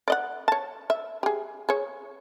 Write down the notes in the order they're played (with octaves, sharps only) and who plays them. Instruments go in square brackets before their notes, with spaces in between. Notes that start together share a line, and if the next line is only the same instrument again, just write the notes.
[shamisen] D5 D#5 F#5
C#5 A5
E5
G4 G#4
G#4 C#5